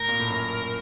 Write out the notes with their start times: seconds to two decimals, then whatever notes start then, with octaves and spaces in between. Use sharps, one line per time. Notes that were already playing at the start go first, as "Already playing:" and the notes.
Already playing: A2 A#4
0.08 A#2
0.19 A2
0.30 F#2